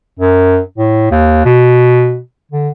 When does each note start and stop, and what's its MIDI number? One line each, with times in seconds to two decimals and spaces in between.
0.19 0.58 42
0.78 1.08 45
1.11 1.44 39
1.45 2.19 47
2.52 2.69 50